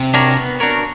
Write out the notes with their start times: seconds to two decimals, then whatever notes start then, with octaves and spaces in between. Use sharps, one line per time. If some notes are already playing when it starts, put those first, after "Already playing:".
Already playing: C3
0.14 D4 F#4 A#4 C#5
0.37 B3
0.60 D4 F#4 A#4 C#5